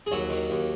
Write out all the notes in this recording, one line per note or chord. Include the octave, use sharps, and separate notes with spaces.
G#4
D#2 F#3 F#4
D#3
D#2